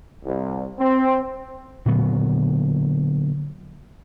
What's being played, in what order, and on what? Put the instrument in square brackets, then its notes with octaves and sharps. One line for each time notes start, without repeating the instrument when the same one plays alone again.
[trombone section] C2
C4
[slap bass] A#2 D3 F#3 B3